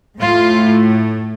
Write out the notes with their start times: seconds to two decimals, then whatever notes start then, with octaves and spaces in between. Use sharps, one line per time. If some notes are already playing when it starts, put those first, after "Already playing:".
0.17 A2 A3 F4